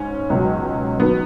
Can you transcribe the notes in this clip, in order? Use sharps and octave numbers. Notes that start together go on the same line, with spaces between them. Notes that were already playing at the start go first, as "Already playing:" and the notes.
Already playing: G#2 C#4
C#2 B2 F#3
D#3 F#3 B3